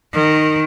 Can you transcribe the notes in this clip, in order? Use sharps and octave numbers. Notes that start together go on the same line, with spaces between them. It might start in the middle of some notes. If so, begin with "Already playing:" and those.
D#3